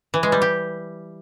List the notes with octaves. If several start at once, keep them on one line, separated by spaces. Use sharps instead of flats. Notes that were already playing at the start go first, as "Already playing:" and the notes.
E3
G#3
G3
G4